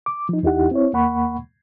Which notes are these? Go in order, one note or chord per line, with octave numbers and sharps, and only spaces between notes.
D6
F3 D#4
E2 D#4 E4 G4 F#5
C4 E4 C#5
D#2 A#3 F#5 B5 C#6